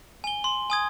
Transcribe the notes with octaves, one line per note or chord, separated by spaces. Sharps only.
G#5 G7
C6
G#5 D#6 G#6